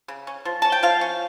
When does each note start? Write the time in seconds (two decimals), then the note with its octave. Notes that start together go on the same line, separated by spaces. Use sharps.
0.08 C#3
0.27 C#4
0.45 F3
0.62 C#4 A5
0.72 G5
0.83 F3 F5
1.01 C#4